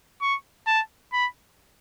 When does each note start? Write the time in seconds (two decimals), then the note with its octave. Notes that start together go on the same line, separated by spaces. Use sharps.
0.22 C#6
0.67 A5
1.13 B5